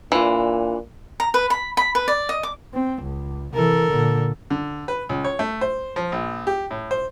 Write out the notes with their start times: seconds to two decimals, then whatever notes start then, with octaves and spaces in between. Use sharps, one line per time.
0.12 A#2 E3 D4 F4
1.20 A#5
1.34 B4
1.50 B5
1.77 B5
1.95 B4
2.08 D5
2.29 D#5
2.43 D6
2.74 C4
3.03 C#2
3.54 C3 E3 A4 A#4
3.88 A#2 D3
4.50 D3
4.88 B4
5.09 C#2
5.24 C#5
5.39 A3
5.61 C5
5.96 F3
6.12 A#1
6.47 G4
6.71 A2
6.91 C5